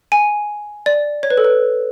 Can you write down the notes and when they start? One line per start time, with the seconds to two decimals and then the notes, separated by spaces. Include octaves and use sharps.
0.12 G#5
0.86 D5
1.23 C#5
1.30 B4
1.37 A4
1.44 B4